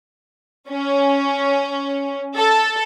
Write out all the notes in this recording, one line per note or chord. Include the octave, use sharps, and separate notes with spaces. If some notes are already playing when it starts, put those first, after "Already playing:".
C#4
A4